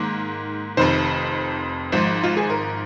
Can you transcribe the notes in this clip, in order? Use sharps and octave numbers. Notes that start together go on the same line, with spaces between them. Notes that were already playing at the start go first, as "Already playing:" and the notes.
Already playing: G#2 D#3 A#3
F1 F2 D#3 C5
G#1 G#2 F3 C5
F4
G#4
A#4